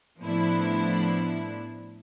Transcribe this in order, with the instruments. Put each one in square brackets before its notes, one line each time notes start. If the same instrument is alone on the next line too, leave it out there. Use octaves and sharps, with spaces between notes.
[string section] A2 F3 B3 D4 E4